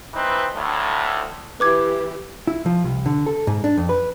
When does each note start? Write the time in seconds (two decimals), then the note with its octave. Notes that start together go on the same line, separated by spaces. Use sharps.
0.14 E3 C4 D#4 B4
0.55 D2 A2
1.60 E3 E4 G4 B4 D6 G#6
2.47 E4
2.66 F3
2.84 C2
3.06 D3
3.26 A4
3.47 G#2
3.64 D4
3.77 F2
3.89 B4